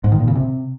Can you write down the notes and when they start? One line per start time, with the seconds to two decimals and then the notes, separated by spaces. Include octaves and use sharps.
0.04 G#2
0.12 D#3
0.20 A#2
0.28 C#3
0.35 C3